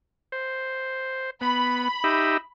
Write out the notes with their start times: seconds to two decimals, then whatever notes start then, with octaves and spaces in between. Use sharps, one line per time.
0.32 C5
1.41 B3 B5
2.04 D#4 G4 E5